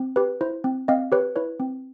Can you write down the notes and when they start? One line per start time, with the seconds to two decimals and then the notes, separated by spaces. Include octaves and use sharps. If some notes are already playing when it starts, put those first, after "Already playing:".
Already playing: C4
0.16 G4 B4
0.41 E4 C5
0.64 C4
0.88 C4 D#5 F5
1.12 G4 B4 C#5
1.36 E4 B4 C#5
1.60 C4